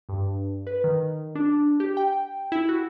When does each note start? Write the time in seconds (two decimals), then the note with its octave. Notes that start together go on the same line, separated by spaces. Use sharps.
0.09 G2
0.67 B4
0.84 D#3
1.35 D4
1.80 G4
1.97 G5
2.52 E4
2.69 F#4